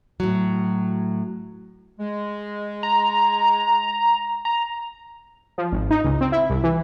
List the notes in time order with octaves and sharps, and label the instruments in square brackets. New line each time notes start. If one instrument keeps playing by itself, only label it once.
[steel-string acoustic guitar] A2 F#3
[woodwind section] G#3
[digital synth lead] A#5
A#5
[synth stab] F3
G#1
D#4
C#2
C4
E4
C2
E3